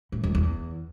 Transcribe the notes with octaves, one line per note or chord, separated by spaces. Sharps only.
A2
F2
E2